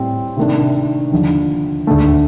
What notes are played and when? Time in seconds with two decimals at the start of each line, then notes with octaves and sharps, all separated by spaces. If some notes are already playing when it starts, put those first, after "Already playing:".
Already playing: A2 G3 C4
0.37 C3 D#3 A3 D4
1.11 D#2 D3 F3
1.87 D2 D3 A3